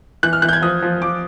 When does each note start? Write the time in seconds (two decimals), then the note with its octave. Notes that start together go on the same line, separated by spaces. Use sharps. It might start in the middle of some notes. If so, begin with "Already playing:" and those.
0.23 E3 F#6
0.33 F6
0.42 E3 F#6
0.49 G6
0.53 G#6
0.62 F3 D#6
0.82 F3
1.02 F3 D6